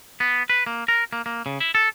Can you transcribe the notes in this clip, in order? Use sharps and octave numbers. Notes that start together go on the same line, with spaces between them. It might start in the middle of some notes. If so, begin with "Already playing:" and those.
B3
B4
A#3
A#4
A#3
A#3
C#3
E4
A4